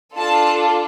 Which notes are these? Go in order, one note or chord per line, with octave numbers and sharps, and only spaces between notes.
D4 F4 A4 A5